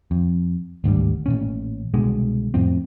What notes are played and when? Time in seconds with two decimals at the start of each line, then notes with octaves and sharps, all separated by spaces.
0.11 F2
0.84 G#1 D2 G2 G3
1.26 A1 A#2 C#4
1.94 C2 B2 D3 G#3
2.54 F2 A2 F3 C4